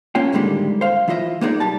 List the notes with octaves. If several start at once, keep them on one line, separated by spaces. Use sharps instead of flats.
A#3 C#4 F4 C#5 G5
A2 D3 D#3 G3 G#3 A#3
C5 F5
E3 E4 F4 D#5 E5
A#3 B3 D#4 G#4 D5
B1 G3 A5